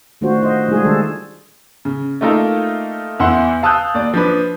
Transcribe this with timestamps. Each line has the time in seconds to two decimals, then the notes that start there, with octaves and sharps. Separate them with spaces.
0.21 D#3 A3 D4 F4 F#4 C5
0.43 C5 D#5
0.68 G3 G#3 D#4 F4 G#4 A4
0.84 D#3 G3 G#3 D4 A4
1.85 C#3
2.21 A3 A#3 D#4 F4 A4 A#4
3.20 E2 E4 F#5 C6
3.63 F5 A5 D#6 E6 F#6 G6
3.94 D#2 D5
4.13 F3 D4 B4